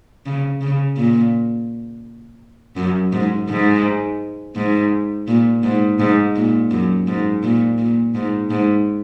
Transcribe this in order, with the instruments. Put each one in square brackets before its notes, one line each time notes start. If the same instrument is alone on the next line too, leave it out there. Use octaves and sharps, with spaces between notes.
[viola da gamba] C#3
C#3
A#2
F#2
G#2
G#2
G#2
A#2
G#2
G#2
A#2
F#2
G#2
A#2
A#2
G#2
G#2